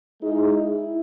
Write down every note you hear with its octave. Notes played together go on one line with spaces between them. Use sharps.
G#3 D#4 E4 G#4
E4